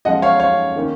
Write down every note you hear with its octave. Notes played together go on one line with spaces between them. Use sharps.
F#2 F3 G#3 D#5 F#5
C#5 F5
C#5 F5
D#3 A#3 C#4